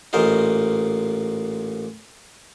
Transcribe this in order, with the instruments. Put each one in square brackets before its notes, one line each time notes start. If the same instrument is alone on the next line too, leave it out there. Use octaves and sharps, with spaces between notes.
[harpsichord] A1 A#2 A#4 C5 D#5